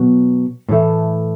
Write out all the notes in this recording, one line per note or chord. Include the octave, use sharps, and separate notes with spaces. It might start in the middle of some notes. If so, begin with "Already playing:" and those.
Already playing: B2 F#3 B3
A2 E3 A3